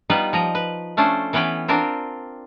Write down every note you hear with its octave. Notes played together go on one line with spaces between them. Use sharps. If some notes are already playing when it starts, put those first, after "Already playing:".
G3 B3 D#4 F4 B4
F3 D#5 A#5
B4
A3 C#4 D4 F4 A4 C5
E3 B3 C#4 B4 G5
C4 D4 F4 A#4 C5